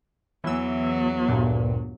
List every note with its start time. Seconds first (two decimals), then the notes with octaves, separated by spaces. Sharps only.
0.44 E2 E3 F#3 E6
1.29 D2 G2 A#2